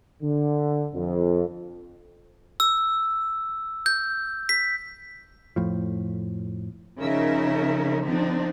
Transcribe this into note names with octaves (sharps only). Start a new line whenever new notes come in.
D3
F2
E6
G6
B6
F2 A2 F3
C#3 F3 C#4 D#4 A#4 E5
D3 F3 C4 D4 D#4